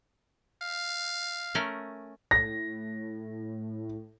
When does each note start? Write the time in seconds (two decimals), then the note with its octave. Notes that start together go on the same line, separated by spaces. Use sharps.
0.62 F5
1.55 A3 C#4 A#4
2.31 A2 A#6